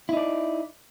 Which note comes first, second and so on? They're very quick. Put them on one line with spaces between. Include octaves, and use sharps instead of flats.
E4 D#4 D5